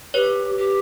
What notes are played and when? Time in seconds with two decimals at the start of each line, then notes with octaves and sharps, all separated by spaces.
0.14 G4 B4 C#5
0.57 G4